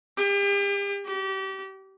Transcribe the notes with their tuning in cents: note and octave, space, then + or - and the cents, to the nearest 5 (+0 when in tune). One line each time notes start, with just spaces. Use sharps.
G4 +40
G4 -30